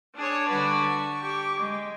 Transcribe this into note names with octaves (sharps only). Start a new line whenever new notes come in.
D4 G#4 C#5
D3 G3 D4 F#4 B4
C#6
G4 C#6 D6
G#3